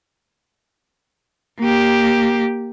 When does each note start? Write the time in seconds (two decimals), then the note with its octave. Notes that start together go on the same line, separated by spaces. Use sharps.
1.60 A#3 G4